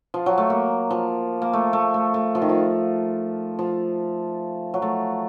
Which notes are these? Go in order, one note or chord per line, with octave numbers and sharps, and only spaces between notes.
F3
F#3
A3
A#3
F3
A#3
A3
A3
A3
A3
F3
D#3
F3
F3
F#3
A3